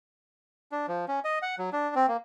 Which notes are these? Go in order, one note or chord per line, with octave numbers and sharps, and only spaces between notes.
D4
F3
C#4
D#5
F#5
F#3
D4
C4
A#3